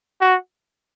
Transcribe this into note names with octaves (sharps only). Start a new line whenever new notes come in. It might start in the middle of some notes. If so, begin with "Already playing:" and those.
F#4